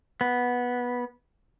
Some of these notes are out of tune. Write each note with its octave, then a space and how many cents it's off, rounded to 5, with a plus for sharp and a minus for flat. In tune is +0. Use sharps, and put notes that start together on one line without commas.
B3 -10